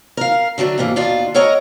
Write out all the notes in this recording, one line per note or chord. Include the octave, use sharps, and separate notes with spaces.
A#4 F5
D3 F#3 A3 D4
G#2 C3 E3 A#3
D#2 B2 D4 F4
A4 A#4 C#5 D#5 F#5 A#5